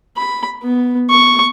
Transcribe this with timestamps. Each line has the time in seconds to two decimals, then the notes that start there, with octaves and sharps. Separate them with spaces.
0.17 B5
0.63 B3
1.10 C#6